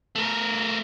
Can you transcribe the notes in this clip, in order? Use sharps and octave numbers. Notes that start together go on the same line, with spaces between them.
A3 A#4